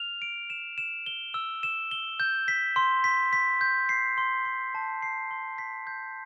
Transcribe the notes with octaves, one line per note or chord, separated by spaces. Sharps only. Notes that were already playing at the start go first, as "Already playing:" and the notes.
Already playing: F6 F7
D7
E7
E7
G7
E6
E7
G7
G6
B6
C6
B6
B6
G6
C7
C6
C6
A5
C7
C6
B6
G6